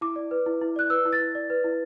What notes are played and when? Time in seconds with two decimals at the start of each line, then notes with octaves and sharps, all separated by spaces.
0.01 E4 D6
0.16 D5
0.31 B4
0.46 E4
0.61 E4
0.76 D5 F#6
0.90 B4 E6
1.05 E4
1.13 A6
1.20 E4
1.35 D5
1.50 B4
1.64 E4